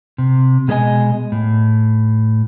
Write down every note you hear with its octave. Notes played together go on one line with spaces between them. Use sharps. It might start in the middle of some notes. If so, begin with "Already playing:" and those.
C3
B2 G#3 A#3 E4 D#5 G#5
A2